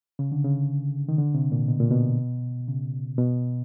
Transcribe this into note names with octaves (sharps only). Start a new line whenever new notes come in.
C#3
D3
C#3
D#3
D3
C3
A#2
B2
A#2
B2
C#3
B2